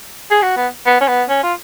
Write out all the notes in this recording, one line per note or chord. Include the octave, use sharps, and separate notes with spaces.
G#4
F#4
B3
B3
C#4
B3
C#4
F4